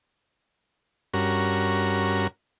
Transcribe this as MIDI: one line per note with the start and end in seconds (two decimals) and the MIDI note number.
1.14 2.27 43
1.14 2.27 61
1.14 2.27 66
1.14 2.27 70